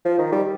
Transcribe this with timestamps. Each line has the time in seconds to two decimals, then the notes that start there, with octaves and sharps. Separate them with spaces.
0.05 F3
0.19 D#3
0.32 G3